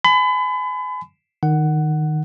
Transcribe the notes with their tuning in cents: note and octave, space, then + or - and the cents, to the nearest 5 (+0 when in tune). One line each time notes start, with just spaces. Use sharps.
G#5 +30 B5 +35
D#3 -10 F#5 +10